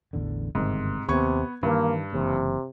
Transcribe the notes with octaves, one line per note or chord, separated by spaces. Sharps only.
A1 E2 D3
G1 G#2 C3 D#3
D#2 C3 B3 C4 C#6 G#6
G2 D#3 E3 A#3
F#1 C3 E3 A#3